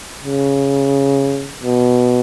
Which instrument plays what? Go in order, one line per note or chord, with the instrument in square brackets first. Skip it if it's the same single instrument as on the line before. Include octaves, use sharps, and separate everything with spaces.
[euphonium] C#3
B2